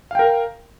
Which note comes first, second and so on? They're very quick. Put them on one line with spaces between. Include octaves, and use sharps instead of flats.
F5 G5 A#4